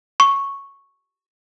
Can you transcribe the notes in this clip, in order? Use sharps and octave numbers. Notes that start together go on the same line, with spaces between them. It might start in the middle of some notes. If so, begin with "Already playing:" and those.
C#6